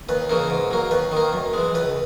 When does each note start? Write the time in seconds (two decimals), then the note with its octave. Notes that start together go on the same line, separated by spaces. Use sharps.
0.09 D#2 B4
0.30 C#3 E3 A#3
0.50 G#2
0.71 F#3 A#3
0.91 D#2 B4
1.12 D#3
1.17 A#3
1.33 F#2
1.53 E3 G#3
1.74 C#2 B4